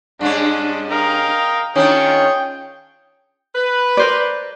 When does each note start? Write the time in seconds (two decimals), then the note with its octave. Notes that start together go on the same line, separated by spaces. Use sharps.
0.21 G2 G#3 C#4 D4
0.91 A#4 D#5 F5 G5
1.75 D#3 C#4 D4 F4 G#4 C#5 G5
3.55 B4
3.97 A#4 C5 D5